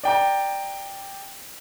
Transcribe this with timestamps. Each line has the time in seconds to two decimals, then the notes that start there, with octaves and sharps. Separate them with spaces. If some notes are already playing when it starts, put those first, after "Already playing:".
0.03 D5 G5 A#5